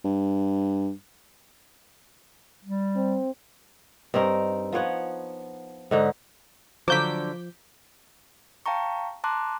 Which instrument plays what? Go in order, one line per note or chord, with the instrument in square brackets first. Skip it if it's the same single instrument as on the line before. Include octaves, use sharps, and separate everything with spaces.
[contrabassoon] G2
[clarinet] G3
[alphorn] C4
[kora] G2 C4 D#4 A#4
F3 B3 C#5 F#5
G#2 D3 D#4
[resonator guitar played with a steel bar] D3 F#3 [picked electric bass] F3 [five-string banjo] C5 F5 [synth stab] D6 G6 B6
[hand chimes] F5 G5 A5 A#5 C#6
A5 A#5 C6 D6 F#6